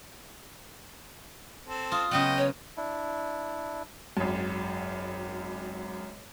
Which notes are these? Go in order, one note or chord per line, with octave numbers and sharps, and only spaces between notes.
C4 A4
F4 D#6
C#3 F#3 B3 D#5 G5
C#5
D4 E4
G#1 F#2